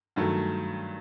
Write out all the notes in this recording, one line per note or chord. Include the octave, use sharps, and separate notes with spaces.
G2 D#3 F#3 A3